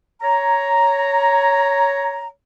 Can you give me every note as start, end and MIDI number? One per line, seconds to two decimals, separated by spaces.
0.22 2.29 73
0.22 2.29 82